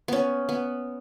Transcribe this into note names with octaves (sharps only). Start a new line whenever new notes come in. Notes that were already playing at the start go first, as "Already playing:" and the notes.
B3 C#4
B3